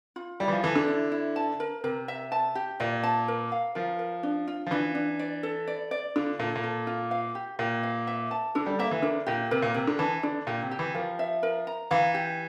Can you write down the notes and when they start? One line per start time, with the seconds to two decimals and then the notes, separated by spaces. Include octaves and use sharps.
0.16 F4
0.40 G3 E4
0.48 E3
0.52 F3
0.63 E3 A4
0.76 D3
0.88 E4
1.12 E4
1.36 A5
1.60 A#4
1.84 C3 A#4
2.08 E5
2.32 A5
2.55 G4
2.80 A#2 D5
3.03 A5
3.28 A#4
3.52 F5
3.75 F3 A#4
3.99 A#4
4.23 D4
4.48 F4
4.67 F3
4.71 E3 D4
4.95 D4
5.19 D5
5.43 A4
5.67 D5
5.91 D5
6.16 D3 F4
6.39 A#2 A4
6.56 A#2
6.64 A4
6.87 F4
7.11 F5
7.35 G4
7.59 A#2 G4
7.83 F5
8.07 E5
8.31 A5
8.55 D3 A4
8.66 G3
8.79 A#3 E5
8.91 E3
9.02 D3 A#4
9.26 A#2 G4
9.51 C3 A#4
9.62 A#2
9.74 C3 A#4
9.87 D3
9.99 E3 A5
10.23 D3 D5
10.47 A#2 G4
10.63 C3
10.71 G4
10.79 E3
10.94 F3 A#4
11.19 E5
11.43 A#4
11.67 A#5
11.91 E3 F5
12.14 G4